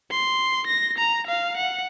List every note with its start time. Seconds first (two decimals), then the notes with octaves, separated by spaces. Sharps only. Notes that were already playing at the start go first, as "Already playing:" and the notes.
0.11 C6
0.67 A#6
0.98 A#5
1.27 F5
1.57 F#5